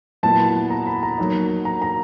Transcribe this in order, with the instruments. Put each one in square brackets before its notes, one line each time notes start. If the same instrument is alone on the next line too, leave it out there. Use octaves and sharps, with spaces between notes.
[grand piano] A#2 F#3 B3 E4 [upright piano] A5
[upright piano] A#5
B5
A#5
[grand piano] F#3 A#3 D#4
[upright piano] A#5
A#5